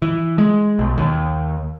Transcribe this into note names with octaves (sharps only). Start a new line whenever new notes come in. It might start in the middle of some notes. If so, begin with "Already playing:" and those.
E3
G#3
B1
D#2